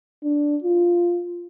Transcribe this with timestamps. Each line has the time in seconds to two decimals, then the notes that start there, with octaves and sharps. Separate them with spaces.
0.24 D4
0.64 F4